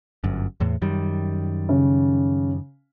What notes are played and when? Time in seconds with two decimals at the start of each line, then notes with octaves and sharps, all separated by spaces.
0.24 G1 F#2
0.60 E2 A2
0.82 F#2 D#3 G3
1.69 C#3